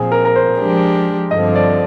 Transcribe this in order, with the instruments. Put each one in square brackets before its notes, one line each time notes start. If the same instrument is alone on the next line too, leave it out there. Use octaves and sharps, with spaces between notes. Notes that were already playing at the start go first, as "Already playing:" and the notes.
Already playing: [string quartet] A#2 F3 C4 [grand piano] G#4
[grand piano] A#4
A#4
C5
[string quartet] F3 G#3 D4 G4
[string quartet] G2 D3 F3 C4 [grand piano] D#5
[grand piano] D5